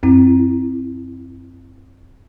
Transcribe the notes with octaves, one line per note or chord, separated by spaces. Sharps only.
F#2 C4 E4